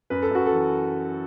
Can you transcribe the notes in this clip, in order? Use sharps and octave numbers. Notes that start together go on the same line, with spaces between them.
F#2 B4
A4
F#2 F#4
A4
E3